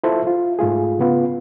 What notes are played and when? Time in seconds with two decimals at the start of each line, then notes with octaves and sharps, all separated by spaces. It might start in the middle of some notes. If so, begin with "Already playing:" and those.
0.04 E4 F4 A4 C5 E5
0.27 F4
0.59 G#2 A3 F4 G#4
0.99 C#3 B3 F4